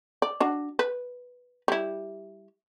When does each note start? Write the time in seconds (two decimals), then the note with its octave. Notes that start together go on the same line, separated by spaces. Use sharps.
0.22 D5
0.40 D4 F#4
0.79 B4
1.68 G3 E4